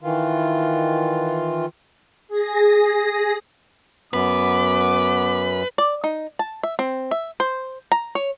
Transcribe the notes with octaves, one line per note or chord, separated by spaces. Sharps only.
D#3 E3 F4
G#4 A#6
F#2 B3 B4 D6
D5
D#4
A5
E5
C4
E5
C5
A#5
C#5